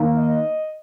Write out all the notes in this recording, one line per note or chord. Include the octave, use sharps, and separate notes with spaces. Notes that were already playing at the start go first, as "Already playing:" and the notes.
Already playing: D#3 A#3
D#5